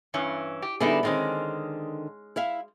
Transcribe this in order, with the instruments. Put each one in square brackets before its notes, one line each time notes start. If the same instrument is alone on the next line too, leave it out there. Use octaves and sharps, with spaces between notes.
[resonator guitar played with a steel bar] G2 E3 C#4
G4
[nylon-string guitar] D3 G3 B3 [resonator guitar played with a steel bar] D#4 E4 G#4
[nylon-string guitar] D3 D#3 C4 [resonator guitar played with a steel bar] G#3 C#4 D#4
[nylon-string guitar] E4 E5 F5